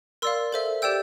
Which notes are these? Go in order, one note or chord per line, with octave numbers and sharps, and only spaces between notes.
A#4 D5 F5 C6 E6
A4 C5 E5
G4 D5 G5 E6 G6